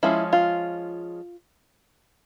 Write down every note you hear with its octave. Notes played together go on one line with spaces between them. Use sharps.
F3 G#3 C#4 E4
F4